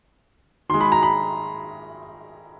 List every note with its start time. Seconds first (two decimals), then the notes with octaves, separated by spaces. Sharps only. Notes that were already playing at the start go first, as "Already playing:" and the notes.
0.69 D#3 G#3 C6
0.81 B5
0.92 A#5
1.03 B5